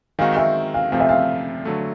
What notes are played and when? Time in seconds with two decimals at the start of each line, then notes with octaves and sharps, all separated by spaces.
0.19 D#3 G#3 C4 D#4 F#4 F5
0.37 E5
0.74 F5
0.92 C3 F3 A3 C4 F5
1.00 E5
1.09 F5
1.65 D3 F#3 A3